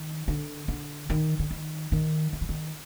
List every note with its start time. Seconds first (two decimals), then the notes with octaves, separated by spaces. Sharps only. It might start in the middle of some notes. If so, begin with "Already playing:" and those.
Already playing: D#3
0.28 D3
0.68 D3
1.10 D#3
1.39 D3
1.51 D#3
1.92 D#3
2.33 D#3
2.41 E3
2.49 D#3